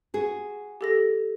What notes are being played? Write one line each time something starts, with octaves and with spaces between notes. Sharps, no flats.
F#4 G#4
G4 A4 A#6